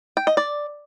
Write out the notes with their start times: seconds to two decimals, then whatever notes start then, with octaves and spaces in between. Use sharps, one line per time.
0.17 G5
0.27 D#5
0.37 D5